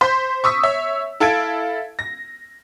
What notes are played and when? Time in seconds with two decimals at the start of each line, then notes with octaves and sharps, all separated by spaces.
0.01 C5 C6 G6 B6
0.44 C#6 D#6 E6 B6
0.63 C#5 E5
1.20 E4 A4 F5 G#6 D7
1.99 A#6